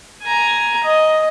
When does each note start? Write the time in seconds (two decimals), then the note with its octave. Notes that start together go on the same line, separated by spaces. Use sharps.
0.23 G#5 A#5
0.84 D#5